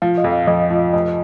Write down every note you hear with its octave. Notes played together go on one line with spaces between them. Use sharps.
F3 F5
D#5
F2
F5
F2 D#5
F3 D#5
F1 D#5